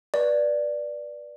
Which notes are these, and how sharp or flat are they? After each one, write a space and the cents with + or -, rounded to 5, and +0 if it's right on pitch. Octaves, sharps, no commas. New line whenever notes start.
B4 -20 D5 +0